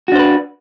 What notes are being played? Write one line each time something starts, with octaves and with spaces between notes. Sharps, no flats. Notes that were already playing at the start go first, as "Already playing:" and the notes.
D4 F#4 B4 C5